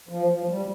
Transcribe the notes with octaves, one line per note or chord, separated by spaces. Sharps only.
F3
F3
G3